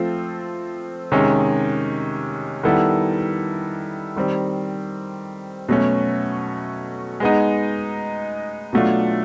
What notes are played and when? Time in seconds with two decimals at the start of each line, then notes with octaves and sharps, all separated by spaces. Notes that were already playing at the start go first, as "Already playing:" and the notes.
Already playing: F3 A3 C4 F4 A4
1.12 C3 D#3 G#3 C#4
2.63 D#3 G3 B3 E4 A4
4.16 D#3 G3 C4
5.69 B2 F#3 A3 C#4
7.20 G#3 B3 D#4
8.73 B2 F#3 A3 D4 F4